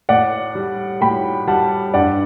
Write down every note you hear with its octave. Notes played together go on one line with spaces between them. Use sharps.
A2 D5 F#5
G3
A2 G5 B5
G3 F#5 A5
G2 D5 F#5